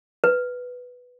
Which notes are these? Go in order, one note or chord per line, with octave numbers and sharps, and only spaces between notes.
B4